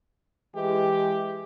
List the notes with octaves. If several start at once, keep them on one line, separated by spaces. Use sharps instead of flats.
E3 G#3 G4